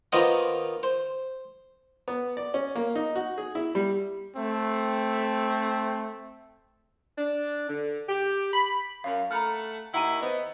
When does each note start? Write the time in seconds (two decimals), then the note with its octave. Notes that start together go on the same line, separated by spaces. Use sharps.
0.12 D#3 A#3 B3 F4 C5 D#5
0.83 C5
2.08 B3
2.37 D5
2.54 C#4
2.75 A#3
2.95 D#4
3.15 F#4
3.38 G#4
3.55 E4
3.75 G3
4.36 A3 C4
7.18 D4
7.69 D3
8.09 G4
8.53 B5
9.04 F#2 F5
9.31 A3 F#5 A#5 B5 F6
9.94 D#2 D#3 E4 F#5 A#5 D#7
10.22 B3 C5 D#5